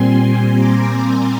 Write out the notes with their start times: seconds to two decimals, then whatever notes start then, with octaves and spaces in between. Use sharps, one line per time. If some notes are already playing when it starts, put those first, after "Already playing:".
Already playing: A#2 G3 C4 G#5 C6
0.20 G#5 C6
0.55 A#5 D6